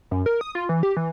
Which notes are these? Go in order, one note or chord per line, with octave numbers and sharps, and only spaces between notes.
F#2
A#4
D#6
F4
E3
G4
E3